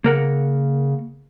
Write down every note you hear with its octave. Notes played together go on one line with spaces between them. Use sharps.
C#3 A#3 A#4 F#5